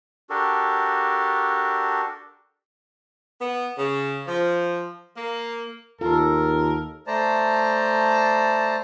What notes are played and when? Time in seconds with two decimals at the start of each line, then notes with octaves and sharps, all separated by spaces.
0.30 D4 F#4 G4 A4 A#4
3.40 B3
3.76 C#3
4.27 F3
5.16 A#3
6.01 D#2 F4 A4 A#4 A5 C6
7.07 A3 C5 D5 A5 A#5